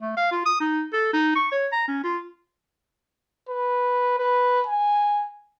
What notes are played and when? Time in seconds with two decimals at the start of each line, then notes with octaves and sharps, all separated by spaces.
0.02 A3
0.17 F5
0.32 F4
0.46 D#6
0.61 D#4
0.93 A4
1.13 D#4
1.36 C#6
1.52 C#5
1.72 A#5
1.88 C#4
2.04 F4
3.49 B4
4.18 B4
4.67 G#5